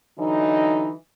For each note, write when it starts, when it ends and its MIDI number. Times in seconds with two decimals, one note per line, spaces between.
0.19 0.91 50
0.19 0.91 52
0.19 0.91 54
0.19 0.91 63